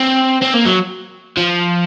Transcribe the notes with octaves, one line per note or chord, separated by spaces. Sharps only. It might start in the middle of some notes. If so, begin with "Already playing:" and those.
Already playing: C4
C4
A#3
F#3
F3